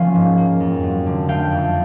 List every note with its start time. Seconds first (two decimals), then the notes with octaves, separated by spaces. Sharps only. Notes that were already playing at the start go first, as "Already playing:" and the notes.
Already playing: F3 A#3 C#4 F5
0.15 G#2
0.38 A#3
0.60 F2
0.83 F#3
1.06 D3
1.28 A3 F5 G5
1.52 F2